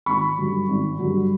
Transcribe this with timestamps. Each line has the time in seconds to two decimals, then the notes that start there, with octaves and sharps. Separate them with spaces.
0.06 G#1 B5 C#6
0.38 G2 D3 F#3
0.69 G#1
0.99 G2 D3 F#3